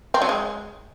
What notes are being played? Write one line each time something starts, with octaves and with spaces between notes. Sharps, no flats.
C4
F#3
G#3